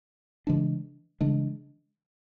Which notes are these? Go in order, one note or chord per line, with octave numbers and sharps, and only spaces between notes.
C#3 E3 G#3 D4
C#3 E3 G#3 D4